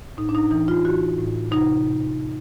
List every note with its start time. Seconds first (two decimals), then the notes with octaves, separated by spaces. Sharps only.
0.17 A2 D#4
0.29 D4
0.35 D#4
0.51 E3 D#4
0.68 F4
0.84 E3 F#4
1.18 A2
1.51 C3 D#4